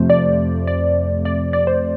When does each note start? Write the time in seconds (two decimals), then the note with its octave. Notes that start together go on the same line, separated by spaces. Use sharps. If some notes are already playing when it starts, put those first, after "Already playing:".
Already playing: F2 C3 F3 A3 C5
0.10 D5
0.67 D5
1.25 D5
1.53 D5
1.67 C5